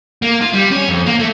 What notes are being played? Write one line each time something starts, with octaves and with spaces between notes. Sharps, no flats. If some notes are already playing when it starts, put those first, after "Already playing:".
A#3
F4
G3
C#4
F2
A#3
A3